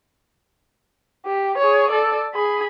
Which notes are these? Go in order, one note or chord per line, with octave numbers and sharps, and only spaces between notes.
G4
G#4 C#5
A4 D5
G#4 B5